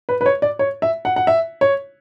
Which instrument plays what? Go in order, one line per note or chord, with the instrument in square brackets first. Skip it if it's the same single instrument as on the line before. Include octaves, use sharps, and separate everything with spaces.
[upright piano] B4
B4
C#5
D5
C#5
E5
F#5
F#5
E5
C#5